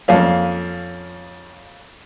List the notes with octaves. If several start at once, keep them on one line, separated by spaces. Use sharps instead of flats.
F2 A#3 C#4 F5